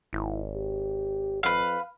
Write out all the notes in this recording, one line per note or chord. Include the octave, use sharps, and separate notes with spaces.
G#1 E4
G4
F2 B4 F5